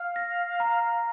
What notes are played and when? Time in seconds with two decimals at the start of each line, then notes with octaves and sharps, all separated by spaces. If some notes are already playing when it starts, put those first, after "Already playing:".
Already playing: F5 F6
0.16 A#6
0.60 A#5